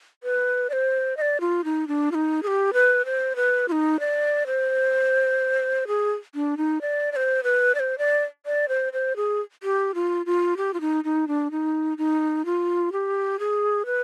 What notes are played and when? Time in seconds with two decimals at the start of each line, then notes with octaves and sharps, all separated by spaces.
0.23 B4
0.70 D5
0.73 C5
1.17 D#5
1.21 D5
1.41 F4
1.64 D#4
1.88 D4
2.11 F4
2.15 D#4
2.43 G#4
2.47 G4
2.73 B4
3.05 C5
3.36 B4
3.68 F4
3.72 D#4
4.00 D5
4.46 C5
5.88 G#4
6.35 D4
6.57 D#4
6.81 D5
7.12 D5
7.16 C5
7.44 B4
7.75 D5
7.80 C5
7.98 D5
8.46 D5
8.69 C5
8.93 C5
9.16 G#4
9.63 G4
9.94 F4
10.26 F4
10.57 G4
10.74 F4
10.81 D#4
11.04 D#4
11.28 D4
11.51 D#4
11.98 D#4
12.45 F4
12.92 G4
13.39 G#4
13.86 B4